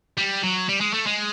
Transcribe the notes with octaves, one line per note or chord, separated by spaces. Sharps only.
G3
F#3
G3
G#3
A3
G#3